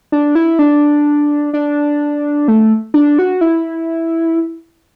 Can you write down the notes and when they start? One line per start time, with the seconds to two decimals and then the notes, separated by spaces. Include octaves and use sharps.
0.12 D4
0.35 E4
0.59 D4
1.54 D4
2.48 A3
2.94 D4
3.19 F#4
3.41 E4